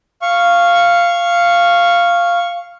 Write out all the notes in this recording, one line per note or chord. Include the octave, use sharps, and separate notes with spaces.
F5 C#6